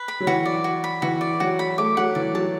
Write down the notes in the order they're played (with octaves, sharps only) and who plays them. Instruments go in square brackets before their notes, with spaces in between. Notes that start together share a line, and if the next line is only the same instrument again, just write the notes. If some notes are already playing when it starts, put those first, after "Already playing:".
Already playing: [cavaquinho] B4
B5
[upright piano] F#3
[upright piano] E3 [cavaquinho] F#4
[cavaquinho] D5
F#4
B5
[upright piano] E3 [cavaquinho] F#4
[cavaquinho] D5
[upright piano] F#3 [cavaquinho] F#4
[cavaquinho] B5
[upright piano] A3 [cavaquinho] D6
[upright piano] F#3 [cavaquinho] F#5
[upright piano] E3 [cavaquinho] D5
[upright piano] F#3 [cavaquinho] A5